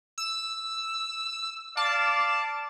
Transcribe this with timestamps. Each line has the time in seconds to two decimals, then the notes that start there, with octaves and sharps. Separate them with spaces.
0.18 E6
1.77 D5 F5 A5 D6